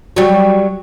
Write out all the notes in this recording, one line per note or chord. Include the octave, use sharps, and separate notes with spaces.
F#3 G3